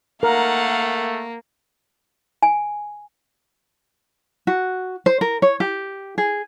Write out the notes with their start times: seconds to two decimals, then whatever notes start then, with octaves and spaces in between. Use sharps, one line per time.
0.23 A3 A#3 A#4 F5 F#5
2.43 G#5
4.47 F#4
5.06 C5
5.21 A#4
5.42 C#5
5.60 G4
6.18 G#4